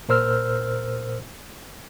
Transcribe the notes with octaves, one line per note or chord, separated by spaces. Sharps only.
A#2 A#4 C5 E6 F6